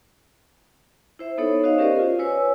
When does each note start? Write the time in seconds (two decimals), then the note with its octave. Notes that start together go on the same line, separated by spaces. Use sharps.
1.19 E4 C5 E5
1.38 B3 D#4 A4 C#5
1.63 D#4 F#4 C5 D#5 F5
1.78 C#4 G4 A#4 C5 D5 D#5
1.99 F4
2.19 B4 C#5 G#5 E6